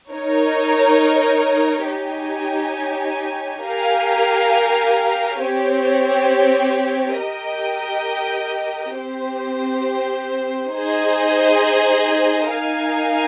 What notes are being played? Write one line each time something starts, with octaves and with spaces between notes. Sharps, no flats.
D#4 A#4 C#5
D#4 G4 C#5 G#5
G4 A#4 F5 G#5
C4 G4 C#5
G4 A#4 D#5 G5
C4 G4 C5
D#4 G#4 C5 D#5
D#4 A#4 F5 G#5